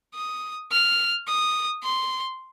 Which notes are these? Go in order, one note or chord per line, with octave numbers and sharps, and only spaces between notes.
D#6
F6
D#6
C6